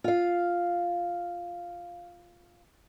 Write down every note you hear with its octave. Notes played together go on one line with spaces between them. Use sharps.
F4 F5